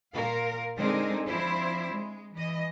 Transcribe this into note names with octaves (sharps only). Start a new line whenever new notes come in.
A#2 A#4 F5
D3 G#3 C4 D#4 G#4 A#4
F3 C4 D4 E4 C5
G#3
E3 D#5